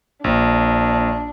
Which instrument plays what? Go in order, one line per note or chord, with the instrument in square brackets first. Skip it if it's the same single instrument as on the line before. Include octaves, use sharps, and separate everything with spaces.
[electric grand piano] A#1 [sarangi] D4